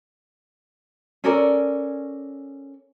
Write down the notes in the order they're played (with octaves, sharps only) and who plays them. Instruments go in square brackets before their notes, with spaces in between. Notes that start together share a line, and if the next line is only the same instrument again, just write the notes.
[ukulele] C#4 A4 A#4 D5